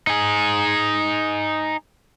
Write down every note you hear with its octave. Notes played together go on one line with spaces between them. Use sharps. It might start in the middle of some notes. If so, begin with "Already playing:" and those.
D#4 G#4